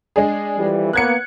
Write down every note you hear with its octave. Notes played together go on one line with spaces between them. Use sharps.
G#3 D4 G#4
F2 E3 G3
A#3 B3 F#6 G#6 C#7